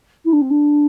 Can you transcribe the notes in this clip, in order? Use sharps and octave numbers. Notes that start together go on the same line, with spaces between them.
E4
D4
C4
D4